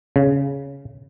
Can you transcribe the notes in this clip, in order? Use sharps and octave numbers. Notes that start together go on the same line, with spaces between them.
C#3